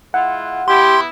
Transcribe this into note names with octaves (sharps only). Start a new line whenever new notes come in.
G#3 E4 F4 F#5
B3 E4 G4 C6